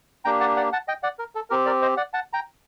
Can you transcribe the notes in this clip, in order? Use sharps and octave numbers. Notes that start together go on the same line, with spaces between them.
A#3 D4 G4 G5 A#5
F#5 A5
D5 F#5
F#5 A5
D#5 G5
D5 F#5
A#4
A4
C4 G4 A#4
A#4 D5
C5 D#5
D5 F#5
F#5 A5
G5 A#5